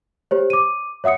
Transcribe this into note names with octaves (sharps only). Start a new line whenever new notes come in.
G4 C5 C#5
D6 D#7
C#5 E5 F#5 D#6 C#7